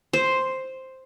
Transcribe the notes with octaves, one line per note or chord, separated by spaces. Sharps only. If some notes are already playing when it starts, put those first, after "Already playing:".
C5